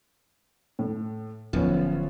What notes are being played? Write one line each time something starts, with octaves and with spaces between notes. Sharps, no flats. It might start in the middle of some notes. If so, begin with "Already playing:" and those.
A2
D1 F3 B3 C#4